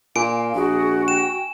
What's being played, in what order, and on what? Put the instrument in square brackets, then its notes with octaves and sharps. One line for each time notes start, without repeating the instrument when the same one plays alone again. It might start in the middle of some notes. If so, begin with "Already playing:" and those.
[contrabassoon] A#2 [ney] F5 [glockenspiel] G#5 D7
[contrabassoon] A#1 [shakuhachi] F#4 [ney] G#4
[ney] G5 [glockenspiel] E7